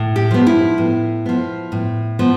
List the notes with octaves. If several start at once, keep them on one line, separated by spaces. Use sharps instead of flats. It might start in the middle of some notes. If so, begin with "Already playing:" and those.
Already playing: A2
G4
F3 B3
E4
A2
F3 B3
A2
F3 B3